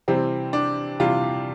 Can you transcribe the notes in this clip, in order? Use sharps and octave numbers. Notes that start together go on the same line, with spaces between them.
C3 E3 G3 C4
D4
C3 E3 G3 F4